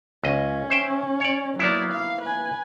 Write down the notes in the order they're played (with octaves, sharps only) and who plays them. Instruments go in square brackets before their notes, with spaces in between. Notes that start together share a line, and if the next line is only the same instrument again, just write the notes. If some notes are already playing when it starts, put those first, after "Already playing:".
[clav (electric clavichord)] C#2 D#5 [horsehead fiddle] C#4
[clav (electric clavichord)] C5 E5 G5
C#5 D5
[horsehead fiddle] F#3 D5 [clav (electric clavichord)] A#3 B3 E4
[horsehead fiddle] F5
B4 G#5